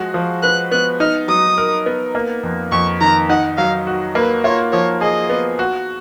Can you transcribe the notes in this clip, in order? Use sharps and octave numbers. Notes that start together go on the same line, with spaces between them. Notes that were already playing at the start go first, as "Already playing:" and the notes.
Already playing: F3 G#3 F#4
F3
B4 F#6
B3 F#6
D#4 F6
F#3 D#6
A#4
B3
A#3
F2
F2 C#6
D#3 A#5
D#4 F#5
F#3 F5
F#4
A#3 B4
F4 C#5
F3 C#5
G#4 D#5
B3
F#4